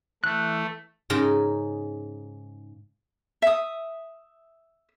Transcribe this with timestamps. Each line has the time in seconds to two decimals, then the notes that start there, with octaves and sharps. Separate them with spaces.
0.24 E3 A3 F#6
1.10 G#2 C#3 D#4 A#4
3.42 E5 D#6